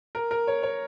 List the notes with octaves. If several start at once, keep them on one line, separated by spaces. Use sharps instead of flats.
A#4
A#4
C#5
C#5